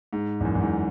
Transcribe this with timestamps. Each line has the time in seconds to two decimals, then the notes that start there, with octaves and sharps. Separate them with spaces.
0.13 G#2
0.40 E2
0.45 F#2
0.55 E2
0.61 G#2